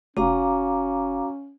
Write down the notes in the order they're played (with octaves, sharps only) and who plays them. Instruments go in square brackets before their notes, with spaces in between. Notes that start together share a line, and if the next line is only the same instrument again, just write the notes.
[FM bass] F1 [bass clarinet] C#4 [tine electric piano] F#4 [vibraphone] F5 A#5 D6